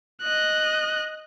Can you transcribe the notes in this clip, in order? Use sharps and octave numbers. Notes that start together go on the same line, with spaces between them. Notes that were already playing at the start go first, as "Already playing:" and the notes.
D#5 F#6